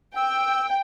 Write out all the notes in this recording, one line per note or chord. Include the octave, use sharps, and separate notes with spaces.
G5 E6